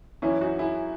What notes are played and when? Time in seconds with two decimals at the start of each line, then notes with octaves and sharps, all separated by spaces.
0.22 F#2 E3 C#4 E4
0.41 D#4 F#4
0.59 E4 G#4